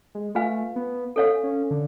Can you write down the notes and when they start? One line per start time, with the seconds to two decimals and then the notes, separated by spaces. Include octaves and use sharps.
0.15 G#3
0.35 A3 F4 B4 F5 G#5
0.76 B3
1.16 C#4 A4 C#5 F5
1.43 C#4
1.71 D3